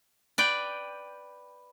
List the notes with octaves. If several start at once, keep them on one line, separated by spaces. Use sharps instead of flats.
B4 D5 G5